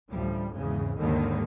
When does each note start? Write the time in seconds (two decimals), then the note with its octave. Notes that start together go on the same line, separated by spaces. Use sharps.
0.11 A1 D2 F3 G3
0.54 G#1 E2 G#2 C#3
0.98 D#2 G#2 D3 D#3 G3 A#3